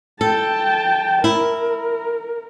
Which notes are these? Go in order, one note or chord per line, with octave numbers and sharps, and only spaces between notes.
A4 G5 A5
E4 A#4